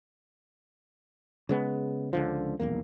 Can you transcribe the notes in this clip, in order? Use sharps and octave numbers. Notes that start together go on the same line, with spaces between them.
C#3 G#3 B3
C#2 D3 F3
D#1 B1 E2 A#3